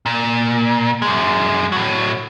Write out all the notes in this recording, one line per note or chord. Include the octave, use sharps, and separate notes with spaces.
A#2
F#2 G#3
A2 F#3